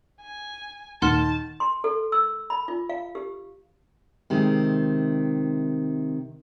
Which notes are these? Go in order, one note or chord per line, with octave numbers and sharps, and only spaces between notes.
G#5
D#2 A#2 D#3 F#5 A5 C6 F6 E7
C6
A4
E6
B5
F4
F5
G4
C3 D#3 G#3